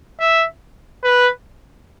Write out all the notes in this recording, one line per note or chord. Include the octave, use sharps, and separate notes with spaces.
E5
B4